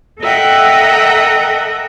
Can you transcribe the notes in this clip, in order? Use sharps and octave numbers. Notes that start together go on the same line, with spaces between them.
A4 A#4 D#5 E5 F#5 G5